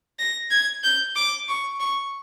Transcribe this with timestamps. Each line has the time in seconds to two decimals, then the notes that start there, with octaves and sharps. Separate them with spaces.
0.19 A#6
0.51 G#6
0.84 G6
1.16 D6
1.48 C#6
1.80 C#6